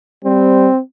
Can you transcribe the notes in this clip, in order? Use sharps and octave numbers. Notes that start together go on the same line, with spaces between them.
G3 C4